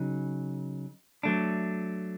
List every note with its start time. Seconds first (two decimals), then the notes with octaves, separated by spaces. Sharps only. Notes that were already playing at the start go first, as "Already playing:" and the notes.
Already playing: C#3 F#3 D#4
1.23 F#3 A3 D4